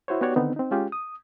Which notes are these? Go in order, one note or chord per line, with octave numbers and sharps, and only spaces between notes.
E4 F#4 C5 C#5
B3 D#4 F#4 G4 C#5 D5
D3 D#3 B3 C4 D#4
C4 D#4
G#3 C#4 F4 G4 G#4
D#6